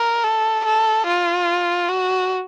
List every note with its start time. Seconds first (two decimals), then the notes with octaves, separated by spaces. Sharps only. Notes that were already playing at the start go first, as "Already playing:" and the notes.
Already playing: A#4
0.24 A4
0.65 A4
1.06 F4
1.88 F#4